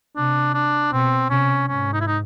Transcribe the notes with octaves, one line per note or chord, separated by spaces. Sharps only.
C3 D4
D4
B2 C4
C3 C#4
G#2 C#4
D#4
E4
D#4